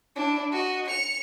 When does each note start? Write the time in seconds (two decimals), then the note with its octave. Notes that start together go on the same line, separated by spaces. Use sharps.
0.15 D4 E4
0.52 F#4 D#5
0.86 C#7 F7